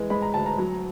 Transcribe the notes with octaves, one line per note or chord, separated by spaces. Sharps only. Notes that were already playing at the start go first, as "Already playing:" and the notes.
Already playing: E3 G#3
G#3 B5
A#5
D2 A5
A#5
F#3